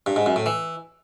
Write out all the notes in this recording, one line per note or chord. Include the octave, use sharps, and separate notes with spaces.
G2
G#2
F#2
A2
E3